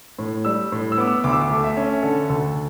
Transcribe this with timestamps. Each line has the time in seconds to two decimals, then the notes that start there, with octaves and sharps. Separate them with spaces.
0.19 A2
0.45 G3 E6
0.72 A2
0.92 E6
0.98 B3 D6
1.07 E6
1.24 D2 D6
1.33 E6
1.41 D6
1.51 A3
1.64 E5
1.77 C#4
2.03 D3 A4
2.29 D2 A4